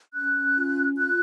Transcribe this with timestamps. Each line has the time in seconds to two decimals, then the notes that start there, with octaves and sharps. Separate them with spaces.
0.14 C#4 F#6
0.55 F4
0.95 F4 F#6